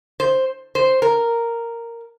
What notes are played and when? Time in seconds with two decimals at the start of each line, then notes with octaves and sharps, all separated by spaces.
0.20 C5
0.75 C5
1.02 A#4